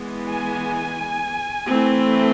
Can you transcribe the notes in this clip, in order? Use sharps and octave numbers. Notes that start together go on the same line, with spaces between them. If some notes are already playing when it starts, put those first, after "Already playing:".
Already playing: E3 G#3 B3
G#5
E3 A3 C4